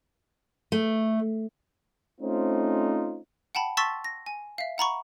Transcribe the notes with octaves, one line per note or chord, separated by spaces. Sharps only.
A3
A3 C4 C#4 D#4 F4 C5
F#5 G5 A5 B5
A5 C6 C#6 E6 A6 B6
A#6
G#5
E5 F5
F#5 A#5 B5 C#6